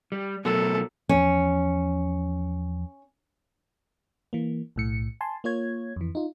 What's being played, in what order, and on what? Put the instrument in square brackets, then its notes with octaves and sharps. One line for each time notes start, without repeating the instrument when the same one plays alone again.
[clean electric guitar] G3
[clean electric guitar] B2 F#3 A3 [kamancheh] A4 A#4
[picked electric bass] E2 F3 [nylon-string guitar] C#4
[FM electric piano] E3 A#3
B1 A2 C#7
G#5 A5 C6
A#3 F4 C#5 G#6
F2 E3
D#4 F4